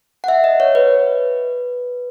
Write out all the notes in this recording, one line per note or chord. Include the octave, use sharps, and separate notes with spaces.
F#5
E5
D#5
C#5
B4